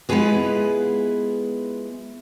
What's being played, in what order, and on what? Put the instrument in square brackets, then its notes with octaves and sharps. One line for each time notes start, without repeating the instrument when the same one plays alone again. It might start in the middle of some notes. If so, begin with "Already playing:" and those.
[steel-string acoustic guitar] G#3 B3 E4 F4 G#4 B4